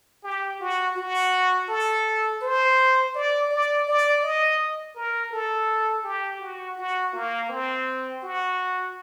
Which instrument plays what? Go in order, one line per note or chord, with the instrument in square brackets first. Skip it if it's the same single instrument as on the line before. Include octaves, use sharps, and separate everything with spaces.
[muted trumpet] G4
F#4
F#4
A4
C5
D5
D5
D5
D#5
A#4
A4
G4
F#4
F#4
A#3
C4
F#4